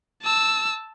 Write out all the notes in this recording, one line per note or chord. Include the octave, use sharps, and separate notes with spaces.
A5 E6